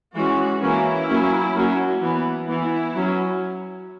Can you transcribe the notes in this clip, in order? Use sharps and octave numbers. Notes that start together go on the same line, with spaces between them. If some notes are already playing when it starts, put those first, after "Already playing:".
E3 G#3 C#4 F#4
E3 A#3 C#4 E4
F#3 A#3 C#4
F#3 A#3 C#4
E3 B3
E3 B3 E4
F#3 C#4